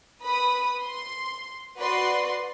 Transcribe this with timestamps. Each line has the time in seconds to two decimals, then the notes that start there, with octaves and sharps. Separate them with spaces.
0.21 B4 B5 D#6
0.82 C6
1.77 F#4 B4 D5 C6